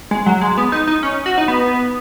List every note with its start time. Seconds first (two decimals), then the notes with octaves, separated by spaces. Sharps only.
0.11 G#3
0.26 F#3
0.41 G#3
0.57 B3
0.72 D#4
0.87 D#4
1.03 C#4
1.26 F#4
1.38 D#4
1.48 B3